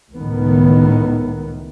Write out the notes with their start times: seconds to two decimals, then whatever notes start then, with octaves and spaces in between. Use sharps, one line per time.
0.16 C#2 A2 D#3 B3